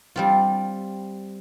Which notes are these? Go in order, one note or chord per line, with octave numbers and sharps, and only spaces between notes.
G3 C4 F4